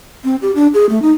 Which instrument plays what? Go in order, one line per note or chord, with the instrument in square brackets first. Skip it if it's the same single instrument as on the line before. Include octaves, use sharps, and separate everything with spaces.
[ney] C4
G4
D4
G#4
A3
D#4